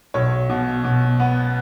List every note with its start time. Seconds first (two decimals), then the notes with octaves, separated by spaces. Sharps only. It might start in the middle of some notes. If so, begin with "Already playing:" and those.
0.14 B1 C#5
0.49 B2
0.84 B2
1.20 B3